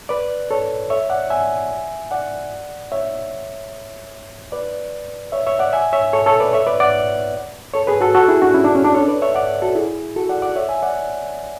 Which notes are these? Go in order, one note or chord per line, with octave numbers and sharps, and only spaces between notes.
B4 D5
A4 C#5
C#5 E5
D5 F#5
E5 G#5
D5 F#5
C#5 E5
B4 D5
C#5 E5
C#5 E5
D5 F#5
E5 G#5
C#5 E5
A4 C#5
A4 C#5
B4 D5
C#5 E5
B4 D5
D5 F#5
A4 C#5
G#4 B4
F#4 A4
F#4 A4
E4 G#4
D4 F#4
C#4 E4
D4
C#4
D4
A4 C#5
B4 D5
C#5 E5
D5 F#5
F#4 A4
E4 G#4
F#4 A4
D5 F#5
D5 F#5
C#5 E5
E5 G#5
D5 F#5